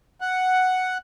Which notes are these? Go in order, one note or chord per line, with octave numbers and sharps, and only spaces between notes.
F#5